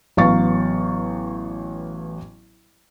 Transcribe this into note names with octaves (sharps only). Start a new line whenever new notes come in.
A1 F#3 B3 F5 C#6 A6